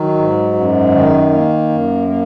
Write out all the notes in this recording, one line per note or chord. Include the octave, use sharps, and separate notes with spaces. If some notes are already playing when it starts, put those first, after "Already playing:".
Already playing: D#3 F#3
G#2
F#2
D#3
A#3
F#2
A#3